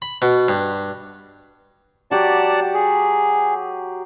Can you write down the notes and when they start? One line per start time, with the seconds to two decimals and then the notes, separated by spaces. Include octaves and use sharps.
0.02 B5
0.22 B2
0.48 G2
2.11 F#3 G4 D5 F#5 A5
2.74 G#4